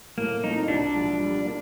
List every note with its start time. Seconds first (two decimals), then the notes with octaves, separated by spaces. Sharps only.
0.18 A2 A#3
0.43 E3 A3 C4 D#4 F4
0.68 C2 D4
0.95 A#2 F3 G#3
1.20 G3
1.45 A#3 D4